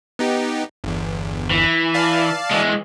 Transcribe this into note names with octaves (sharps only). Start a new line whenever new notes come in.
B3 D#4 G4
G1 E2
E3
D5 F5 A5
E3 G#3